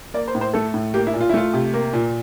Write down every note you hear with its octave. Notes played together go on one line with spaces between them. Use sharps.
A#3 D5
C5
A2
C5
A3 A4
A2
A#3 G4
E4
A#2
F4
E4
A3 F4
C3
A#3
A#2